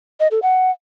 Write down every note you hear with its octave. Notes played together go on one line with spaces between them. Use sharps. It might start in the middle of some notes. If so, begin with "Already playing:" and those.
D#5
A4
F#5